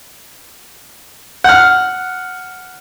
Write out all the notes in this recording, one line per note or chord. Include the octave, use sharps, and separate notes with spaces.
F#5 F6